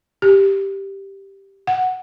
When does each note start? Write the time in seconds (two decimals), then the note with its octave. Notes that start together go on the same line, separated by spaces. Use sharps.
0.22 G4
1.67 F#5